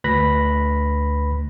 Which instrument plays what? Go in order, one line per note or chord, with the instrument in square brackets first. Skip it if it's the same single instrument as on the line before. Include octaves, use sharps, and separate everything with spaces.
[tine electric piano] D2 B4 B5 A#6